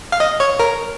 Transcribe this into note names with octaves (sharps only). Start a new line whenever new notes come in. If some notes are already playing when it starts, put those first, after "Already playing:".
F5
D#5
C#5
A#4